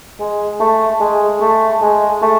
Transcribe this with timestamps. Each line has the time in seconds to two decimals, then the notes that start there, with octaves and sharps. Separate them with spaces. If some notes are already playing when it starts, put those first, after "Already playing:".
0.20 G#3
0.60 A3
1.00 G#3
1.41 A3
1.82 G#3
2.22 A3